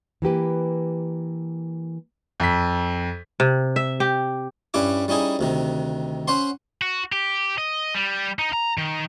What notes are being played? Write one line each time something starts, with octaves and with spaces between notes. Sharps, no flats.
E3 A#3 G4 B4
F2 B6
C3
E5
G4
G2 G3 C#4 E4 D6
G3 C#4 D#4 E4 G#4
D2 C3 D#3
C#4 C5 F#5 B5 C6
F#4
G4
D#5
G3
D#4
A#5
D#3